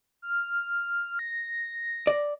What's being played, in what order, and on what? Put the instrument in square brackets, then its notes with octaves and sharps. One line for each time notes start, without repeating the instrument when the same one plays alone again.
[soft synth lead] F6
A#6
[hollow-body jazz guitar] D5